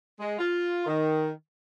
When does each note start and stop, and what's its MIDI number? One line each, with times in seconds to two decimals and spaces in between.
0.19 0.38 56
0.38 0.85 65
0.86 1.30 51